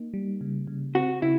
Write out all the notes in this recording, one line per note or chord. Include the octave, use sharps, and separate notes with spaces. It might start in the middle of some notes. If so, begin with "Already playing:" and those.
Already playing: A#3 D#4
G3
C#3
C#3
C4 F#4
C#3 E4